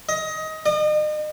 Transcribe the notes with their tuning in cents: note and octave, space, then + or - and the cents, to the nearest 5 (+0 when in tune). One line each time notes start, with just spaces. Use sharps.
D#5 +20
D#5 -40